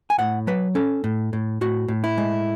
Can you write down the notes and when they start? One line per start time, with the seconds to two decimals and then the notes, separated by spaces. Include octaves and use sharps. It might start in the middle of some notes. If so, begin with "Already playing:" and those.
0.10 G#5
0.19 A2 F#5
0.47 F#3 B4
0.75 C#4 A4
1.04 A2
1.33 A2
1.61 A2 F#4
1.88 A2
2.04 E4
2.18 G#3